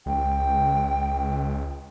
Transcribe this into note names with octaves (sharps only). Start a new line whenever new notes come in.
C#2 G5